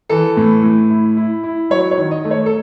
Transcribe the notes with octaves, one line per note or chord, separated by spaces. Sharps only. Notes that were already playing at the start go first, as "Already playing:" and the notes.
E3 A4
A2
A2
E4
E4
E4
F#3 C#5
C#5
D#3
D#5
A3
C#5
A4